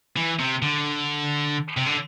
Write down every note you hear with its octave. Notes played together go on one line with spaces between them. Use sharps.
E3
C3
D3
C3
D3